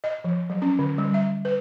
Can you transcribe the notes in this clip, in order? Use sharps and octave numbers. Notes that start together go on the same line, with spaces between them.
D#5
F3
F#3
C#4
D3
G3
E5
B4